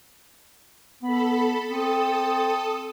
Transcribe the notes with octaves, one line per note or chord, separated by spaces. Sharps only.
B3 A4 B5
C4 A4 D#6